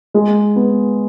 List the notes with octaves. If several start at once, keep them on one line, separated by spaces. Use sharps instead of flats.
G#3
B3